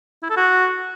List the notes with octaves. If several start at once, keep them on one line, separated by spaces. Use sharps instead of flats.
E4
A4
F#4